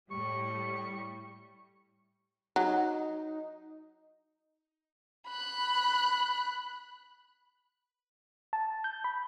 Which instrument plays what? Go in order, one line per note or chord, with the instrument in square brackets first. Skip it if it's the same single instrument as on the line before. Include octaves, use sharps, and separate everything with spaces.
[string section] A2 G3 [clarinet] C#6
[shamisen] F#3 [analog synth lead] D#4
[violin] B5 F#6
[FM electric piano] A5
G6
B5